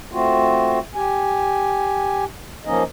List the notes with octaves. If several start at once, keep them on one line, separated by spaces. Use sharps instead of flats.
A3 C4 F4 F#4
G4 G#5
F3 A#3 C#4 D#4 D#5